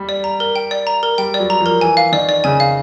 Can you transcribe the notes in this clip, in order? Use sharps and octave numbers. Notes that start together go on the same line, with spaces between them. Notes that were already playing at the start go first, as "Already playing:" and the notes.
Already playing: G3
D5
A#5
A#4
G5
D5
A#5
A#4
G3 G5
D5
F#3
A#5
F3 A#4
E3 G#5
F5
D#3 D5
D5
C#3 G#5
F5